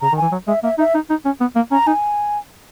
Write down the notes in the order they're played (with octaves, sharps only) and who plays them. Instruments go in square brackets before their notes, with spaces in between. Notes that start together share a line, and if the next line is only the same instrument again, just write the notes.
[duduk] C#3 [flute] A#5
[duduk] D#3
[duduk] E3 [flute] G#5
[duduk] F#3
[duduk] G#3 [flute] E5
[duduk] A#3 [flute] E5
[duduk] D#4 [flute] E5
[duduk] D#4
D#4
C#4
B3
A#3
[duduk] C#4 [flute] A#5
[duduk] D#4 [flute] G#5